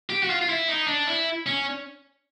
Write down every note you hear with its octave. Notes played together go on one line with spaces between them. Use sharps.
G4
F#4
F4
F4
E4
D#4
D4
E4
C#4